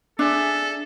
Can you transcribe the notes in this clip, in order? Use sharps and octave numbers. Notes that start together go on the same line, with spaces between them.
D4 G#4 A4 E5